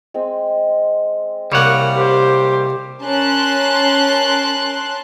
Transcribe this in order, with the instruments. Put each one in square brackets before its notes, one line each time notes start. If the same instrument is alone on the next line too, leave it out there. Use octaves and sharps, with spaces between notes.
[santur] G#3 C4
[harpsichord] C2 A#3 [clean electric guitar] G3 C#5 F#5
[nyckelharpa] G4 C5
[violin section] C#4 A#4 A5 C6 F#6